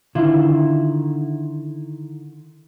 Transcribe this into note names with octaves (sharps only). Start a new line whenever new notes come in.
D3 D#3 E4 F4